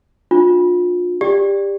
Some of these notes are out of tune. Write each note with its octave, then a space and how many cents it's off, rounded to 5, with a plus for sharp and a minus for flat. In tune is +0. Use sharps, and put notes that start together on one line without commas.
D4 +0 F4 +30
G4 +20 D5 +0